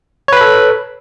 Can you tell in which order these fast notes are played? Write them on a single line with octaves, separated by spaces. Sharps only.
C#5 B4 B5 A4